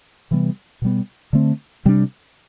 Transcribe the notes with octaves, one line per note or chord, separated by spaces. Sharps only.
C3 E3 G3 B3
B2 G3 B3
D3 A3 C4
C3 G3 B3 D4